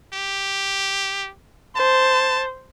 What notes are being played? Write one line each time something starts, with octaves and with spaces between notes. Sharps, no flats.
G4
C5 A5